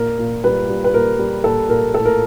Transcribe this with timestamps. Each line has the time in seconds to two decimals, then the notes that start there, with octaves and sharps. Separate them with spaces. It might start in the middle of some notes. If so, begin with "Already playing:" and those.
Already playing: A#2 A#4
0.19 A#2
0.44 G3 B4
0.69 G3
0.84 B4
0.94 A#2 A#4
1.19 G3
1.44 A#2 A4
1.69 A#2 A#4
1.94 A2 A4
2.05 A#4